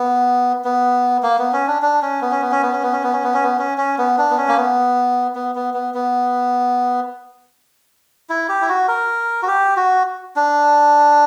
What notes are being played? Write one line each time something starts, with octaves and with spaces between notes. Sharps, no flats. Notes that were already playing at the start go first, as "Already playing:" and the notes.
Already playing: B3
B3
A#3
B3
C#4
D4
D4
C#4
B3
C#4
B3
C#4
B3
C#4
B3
C#4
B3
C#4
B3
C#4
B3
C#4
C#4
B3
D4
B3
C#4
A#3
B3
B3
B3
B3
B3
E4
G4
E4
F#4
A#4
F#4
G4
F#4
D4